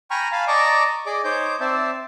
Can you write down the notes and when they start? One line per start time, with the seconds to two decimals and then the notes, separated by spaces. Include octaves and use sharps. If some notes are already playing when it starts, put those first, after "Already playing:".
0.11 G5 G#5 A#5 B5 C#6 F6
0.32 F5 G#5 A5 B5
0.47 D5 D#5 A5 A#5 C#6 D6
1.06 G#4 D5 D#5 D6
1.24 D#4 C5 C#5 D6 G6
1.60 C4 C5 D5 E5 A5